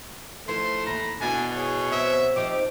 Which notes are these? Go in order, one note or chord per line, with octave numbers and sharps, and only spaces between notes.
F3 A3 E4 B4 C6
D#2 E3 A#5 B5
B2 B3 D4 E4 F#4 G#5
G#4 C#5
C4 E5
F3 C4 D#4 G4 D6